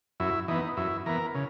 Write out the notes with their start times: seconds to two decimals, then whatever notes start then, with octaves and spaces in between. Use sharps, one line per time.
0.20 F#2 E4
0.48 E3 B3 D#4
0.77 F#2 E4
1.06 E3 B3 A#4
1.35 C#3